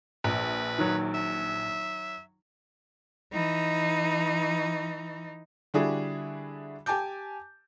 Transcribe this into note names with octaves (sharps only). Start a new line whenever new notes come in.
A#1 B4
D#3 F#3
E5
E3 D#4
D3 G3 D4 E4 F#4 G#4
G4 G#5 A5 D6 G6